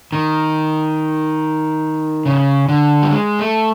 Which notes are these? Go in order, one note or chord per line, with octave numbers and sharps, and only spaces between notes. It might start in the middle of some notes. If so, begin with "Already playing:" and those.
D#3
C#3
D3
G3
G#3
A3